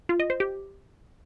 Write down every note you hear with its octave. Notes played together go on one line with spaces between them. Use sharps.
F4
D#5
C5
G4